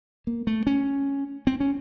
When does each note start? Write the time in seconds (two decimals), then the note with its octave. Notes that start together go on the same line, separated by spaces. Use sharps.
0.27 A#3
0.47 A3
0.67 C#4
1.47 C4
1.60 C#4